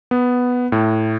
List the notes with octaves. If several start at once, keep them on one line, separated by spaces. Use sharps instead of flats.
B3
A2